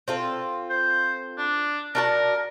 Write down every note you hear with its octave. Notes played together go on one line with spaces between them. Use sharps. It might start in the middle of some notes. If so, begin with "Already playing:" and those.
C4 F4 A4
C5
D4
D4 F#4 A#4 A5